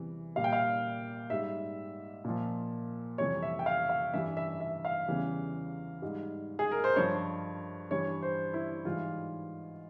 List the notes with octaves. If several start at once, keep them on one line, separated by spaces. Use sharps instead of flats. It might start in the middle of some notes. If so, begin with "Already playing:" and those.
Already playing: E2 C3 E3 G3
A#2 G3 F5
G5
F5
G#2 G3 E5
A#2 F3
F2 C3 E3 G3 C#5
E5
G5
F5
F5
G2 E3 G3 E5
E5
E5
F5
E2 C#3 E3 G3
G#2 G3
G#4
A#4
C5
G2 F3 C#5
G2 E3 G3 C#5
C5
E4
G#2 E3 G3 F4